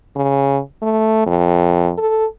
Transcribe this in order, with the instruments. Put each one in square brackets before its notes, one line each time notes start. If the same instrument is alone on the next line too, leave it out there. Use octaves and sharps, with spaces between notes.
[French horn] C#3
A3
F2
A4